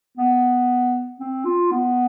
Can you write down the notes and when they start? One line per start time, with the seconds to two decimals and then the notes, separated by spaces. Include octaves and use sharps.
0.18 B3
1.20 C4
1.45 F4
1.71 B3